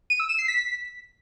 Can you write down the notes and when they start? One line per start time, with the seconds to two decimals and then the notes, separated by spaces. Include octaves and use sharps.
0.10 D#7
0.20 E6
0.29 E7
0.39 C7
0.48 B6